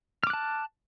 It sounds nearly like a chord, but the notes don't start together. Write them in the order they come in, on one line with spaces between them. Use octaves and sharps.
F6 D6 F#6 A5